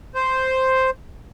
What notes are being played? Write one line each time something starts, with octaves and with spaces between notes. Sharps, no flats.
C5